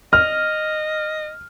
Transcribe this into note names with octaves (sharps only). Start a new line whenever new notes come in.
D#5 F6